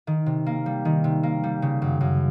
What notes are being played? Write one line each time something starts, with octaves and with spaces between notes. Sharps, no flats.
D#3
C3
A#3
G3
D#3
C3
A#3
G3
C#3
F#2
F#2